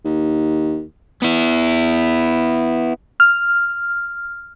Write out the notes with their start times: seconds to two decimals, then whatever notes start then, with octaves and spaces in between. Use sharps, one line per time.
0.04 D#2
1.22 B3 E4
3.20 F6